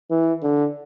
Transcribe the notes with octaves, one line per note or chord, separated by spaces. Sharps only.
E3
D3